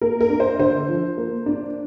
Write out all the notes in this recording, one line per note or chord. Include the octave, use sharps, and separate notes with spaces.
A#3 A#4
A#4
D4
C5
D3 C5
F3
A#3
D4